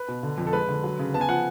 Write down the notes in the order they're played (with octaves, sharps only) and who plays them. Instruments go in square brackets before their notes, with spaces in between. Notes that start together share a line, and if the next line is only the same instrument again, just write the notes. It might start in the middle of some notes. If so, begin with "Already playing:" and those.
Already playing: [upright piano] B4
B2
D3
F2
A4
G#3 B4
D3
F#3
C#3
B3 A5
G#5
F3 F#5